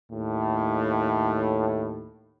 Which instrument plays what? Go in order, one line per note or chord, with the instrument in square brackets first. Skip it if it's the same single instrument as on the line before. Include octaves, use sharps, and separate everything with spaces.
[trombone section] D#2 A2